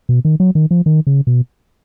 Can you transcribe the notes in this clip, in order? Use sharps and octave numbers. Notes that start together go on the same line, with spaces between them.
B2
D#3
F#3
D#3
F3
D#3
C#3
B2